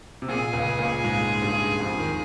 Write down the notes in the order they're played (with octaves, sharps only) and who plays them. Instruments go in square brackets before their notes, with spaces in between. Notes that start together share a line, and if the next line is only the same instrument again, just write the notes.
[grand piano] C3
[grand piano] A#2 [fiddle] G#4
[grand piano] C#2 C#3
A#2 A#3
G#2 G#3
G2 G3
F2 F3
D#2 D#3